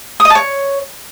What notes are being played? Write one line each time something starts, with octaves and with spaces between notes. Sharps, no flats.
D#6
D#5
A5
C#5